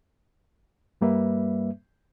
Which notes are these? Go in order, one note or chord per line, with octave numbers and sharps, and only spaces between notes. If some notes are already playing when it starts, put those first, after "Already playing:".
G2 G3 A#3 B4 E5